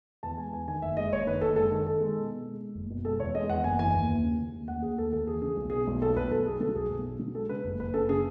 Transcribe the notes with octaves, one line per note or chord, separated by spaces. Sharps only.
E2 A5
G#3 G#5
E2 G#5
D#3 G#5
F#1 E5
G#3 D#5
F#1 C#5
D#3 B4
F#1 A4
G#3 A4
D#3 A4
D#3 A4
G#3
B2
B2
G#3
G#3
F#1
B2
G#3 A4
E2 C#5
G#3 D#5
E2 F#5
F#1 G#5
E3 G#5
D#2
D#2
C#3
C#3
D#2
D#2 F#5
D#2 G#4
D#2 A4
D#2 A4
E3 G#4
C#3 G#4
B1
B2 G#4
B1
B1 A4
B1 B4
B1 A4
B2 G#4
F#3 A4
B1 G#4
B1
B2
F#3
G#3 A4
C#3 B4
F#1
F#1 B4
C#3 A4
C#3 G#4